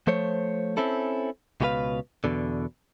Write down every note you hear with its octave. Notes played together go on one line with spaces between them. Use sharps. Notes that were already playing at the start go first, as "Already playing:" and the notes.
F3 A3 C5 C#5
C4 C#4 E4 A4
C#2 B2 D#4 G4 B4 F5
E2 B2 D3